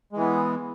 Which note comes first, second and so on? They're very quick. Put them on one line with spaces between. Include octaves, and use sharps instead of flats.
G#3 E3 B3